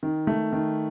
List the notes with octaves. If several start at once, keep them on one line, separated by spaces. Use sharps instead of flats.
D#3
A3
D#3